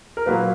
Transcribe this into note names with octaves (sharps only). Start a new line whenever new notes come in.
A#4
A#2 F#3 A#3 B4